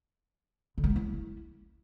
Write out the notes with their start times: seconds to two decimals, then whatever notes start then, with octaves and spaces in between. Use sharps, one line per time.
0.78 D3
0.84 G#3
0.90 D#4
0.96 E4